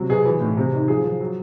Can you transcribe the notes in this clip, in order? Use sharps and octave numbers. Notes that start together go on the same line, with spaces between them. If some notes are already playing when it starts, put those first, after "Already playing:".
Already playing: C3 F#3
B2 G#4
E3
A2
C3
D#3
F3 G#4
F3
F#3